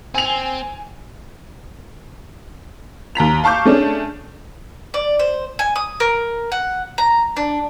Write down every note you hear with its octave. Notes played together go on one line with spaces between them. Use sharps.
C4 G#5 F7
D#2 A#5 B6 F7
F5 A5 C#6 D6 G6
A3 C#4 D4 G#4
D5
C5
G#5
D#6
A#4
F#5
A#5
D4